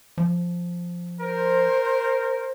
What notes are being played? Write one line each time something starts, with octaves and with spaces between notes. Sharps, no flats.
F3
A#4 C5